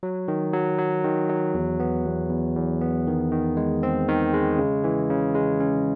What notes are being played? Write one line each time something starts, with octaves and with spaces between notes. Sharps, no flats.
F#3
D#3
F#3
F#3
D#3
F#3
E2
B3
E2
E2
E2
B3
D#3
D#3
G#3
C4
D#3
G#3
C#3
E3
C#3
G#3
C#4